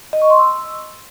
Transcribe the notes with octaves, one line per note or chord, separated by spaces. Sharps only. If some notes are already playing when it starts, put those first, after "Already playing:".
D#5
C#6
C6
E6